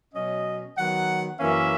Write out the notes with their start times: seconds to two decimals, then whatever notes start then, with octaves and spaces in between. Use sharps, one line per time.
0.14 B2 F#3 C#4 D#5
0.77 D#3 F#3 B3 F#5
1.40 F#2 E3 A#3 C#4 E5